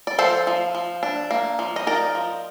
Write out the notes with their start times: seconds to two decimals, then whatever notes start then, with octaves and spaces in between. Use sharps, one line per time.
0.07 D5
0.18 F3 A4 C5
0.47 F3
0.75 F3
1.03 D4
1.31 A#3
1.59 F3
1.76 D#5
1.87 D#4 A#4 D5
2.15 F3